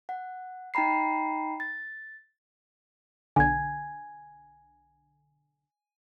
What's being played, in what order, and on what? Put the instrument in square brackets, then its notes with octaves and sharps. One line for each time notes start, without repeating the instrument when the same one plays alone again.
[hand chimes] F#5
D#4 G5 A#5 B5 C7
A6
[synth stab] B1 D3 [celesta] G#5 G#6